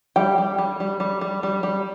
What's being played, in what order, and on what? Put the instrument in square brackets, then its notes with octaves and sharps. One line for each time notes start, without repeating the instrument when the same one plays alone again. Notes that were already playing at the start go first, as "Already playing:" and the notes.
[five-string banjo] G3 G5
G3
G3
G3
G3
G3
G3
G3